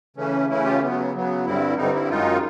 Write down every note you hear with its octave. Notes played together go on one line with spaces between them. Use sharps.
C#3 E3 A3 C#4
C#3 E3 A3 C#4 E4
F4 G4
C#3 F#3 B3
C#3 F#3 B3
G2 D3 G3 C4 E4
G2 D3 G3 C4 D#4
E4
F#2 D#3 G#3 D#4 F4